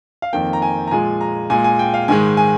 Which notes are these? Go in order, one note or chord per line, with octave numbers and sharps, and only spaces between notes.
F5
F2 D#3 A#3 G5
A#5
G#5
A#5
A#2 F3 G#3 G#5
A#5
A#2 G#3 G#5
G#5
G5
F5
G#2 D#3 G#3 G#5
G#5